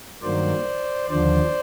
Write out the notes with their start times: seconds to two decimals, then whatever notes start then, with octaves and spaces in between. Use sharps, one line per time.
0.22 G2 D#3 F#3 A#3 C5 D5
1.09 D#2 D3 F3 C5 D5